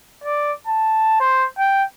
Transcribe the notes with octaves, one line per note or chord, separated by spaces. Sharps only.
D5
A5
C5
G5